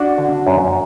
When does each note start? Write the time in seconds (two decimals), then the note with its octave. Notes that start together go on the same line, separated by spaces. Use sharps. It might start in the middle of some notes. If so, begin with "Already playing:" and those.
Already playing: D4 F#4
0.18 D3
0.46 F#2